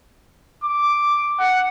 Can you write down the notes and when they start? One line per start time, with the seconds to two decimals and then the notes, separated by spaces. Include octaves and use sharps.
0.64 D6
1.40 F#5